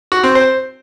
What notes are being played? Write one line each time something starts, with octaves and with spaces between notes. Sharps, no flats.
F#4
C4
C5